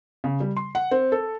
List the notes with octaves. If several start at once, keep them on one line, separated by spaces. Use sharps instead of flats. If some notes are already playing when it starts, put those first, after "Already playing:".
C#3
G3
C6
F#5
C4
A4